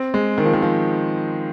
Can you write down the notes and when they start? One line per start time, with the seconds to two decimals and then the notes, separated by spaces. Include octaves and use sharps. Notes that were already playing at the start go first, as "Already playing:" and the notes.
Already playing: C4
0.14 G#3
0.38 D#3
0.45 F3
0.53 D#3
0.62 F3